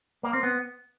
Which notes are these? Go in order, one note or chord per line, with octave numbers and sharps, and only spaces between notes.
A#3
C4
B3